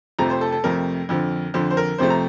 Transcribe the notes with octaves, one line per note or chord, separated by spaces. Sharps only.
F2 C3 F3 A3 A#5
C5
A4
A4
F2 C3 F3 A3 A#4
F2 D3 F3
F2 D3 F3 C5
C5
A#4
F2 C3 F3 A3 C5
A#5